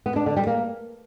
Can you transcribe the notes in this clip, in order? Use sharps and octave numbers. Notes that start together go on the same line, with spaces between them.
B3
D4
D3
G3
A#3